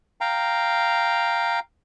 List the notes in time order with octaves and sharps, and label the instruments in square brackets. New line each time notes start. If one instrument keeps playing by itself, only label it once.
[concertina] F5 G5 A#5